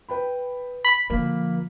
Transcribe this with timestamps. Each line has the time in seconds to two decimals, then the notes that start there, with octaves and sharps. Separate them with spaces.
0.09 B4 G5 B5
0.84 B5
1.10 D3 F3 A#3